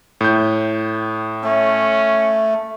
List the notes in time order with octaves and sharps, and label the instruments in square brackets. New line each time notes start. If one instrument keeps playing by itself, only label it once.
[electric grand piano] A2 G6
[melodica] A3 [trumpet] C#4